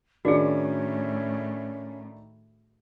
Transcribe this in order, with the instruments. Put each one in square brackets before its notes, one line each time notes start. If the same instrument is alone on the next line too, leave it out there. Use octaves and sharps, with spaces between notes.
[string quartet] A2 [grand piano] D#3 D4 [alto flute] C#4 [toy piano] F#4 G#4